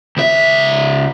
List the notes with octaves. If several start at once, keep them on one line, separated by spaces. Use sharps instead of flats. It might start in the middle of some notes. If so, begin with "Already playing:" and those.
C#2 E5